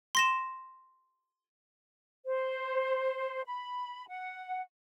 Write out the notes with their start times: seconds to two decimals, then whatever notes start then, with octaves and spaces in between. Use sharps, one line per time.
0.15 C6 A#6 E7
2.25 C5
3.46 B5
4.08 F#5